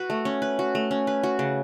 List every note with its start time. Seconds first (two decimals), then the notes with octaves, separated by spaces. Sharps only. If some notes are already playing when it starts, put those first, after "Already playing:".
Already playing: F#4 B4
0.10 A3
0.25 C#4
0.42 B4
0.59 F#4
0.75 A3
0.91 C#4
1.07 B4
1.23 F#4
1.39 C#3